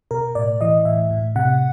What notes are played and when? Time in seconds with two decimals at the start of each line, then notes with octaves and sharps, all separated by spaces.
0.11 B2 A#4
0.35 A2 D5
0.61 E3 D#5
0.85 A2 E5
1.11 A2
1.36 C3 F#5